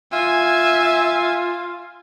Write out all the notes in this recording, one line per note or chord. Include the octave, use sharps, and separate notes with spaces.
F4 E5 G#5